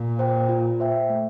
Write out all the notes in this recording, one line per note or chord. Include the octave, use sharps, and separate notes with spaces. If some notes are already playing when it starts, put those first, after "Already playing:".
Already playing: A#2
C5 G5
F4
C5 E5 G5
A3